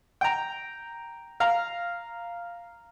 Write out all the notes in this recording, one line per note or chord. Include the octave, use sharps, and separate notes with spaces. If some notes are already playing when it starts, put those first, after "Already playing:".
G5 A#5
F5 A#5